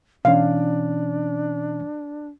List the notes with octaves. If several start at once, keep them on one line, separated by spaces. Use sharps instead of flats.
B2 E3 C#4 D4 F5